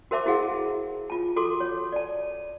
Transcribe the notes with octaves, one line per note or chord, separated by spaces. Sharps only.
F#4 A#4 C5 E5 A5 D6
E4 F#4 G#4 F5 F#5
F4 A5
F#4 A4 C6 D6
C#5
D5 A5